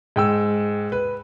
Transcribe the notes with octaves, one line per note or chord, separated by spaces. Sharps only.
G#2 G5 E6
B4